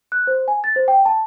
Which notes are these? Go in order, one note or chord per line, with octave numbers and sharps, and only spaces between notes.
F#6
C5
G#5
A6
C5
G5
A5